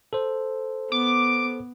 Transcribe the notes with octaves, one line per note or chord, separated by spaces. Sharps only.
A4 C5
B3 D6